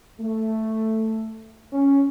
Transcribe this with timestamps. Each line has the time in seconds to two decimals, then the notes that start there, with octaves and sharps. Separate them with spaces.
0.19 A3
1.71 C#4